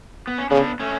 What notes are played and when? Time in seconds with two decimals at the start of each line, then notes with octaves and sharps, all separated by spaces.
0.27 B3
0.38 C#4
0.50 C#3 B3 D4
0.80 A3 C#4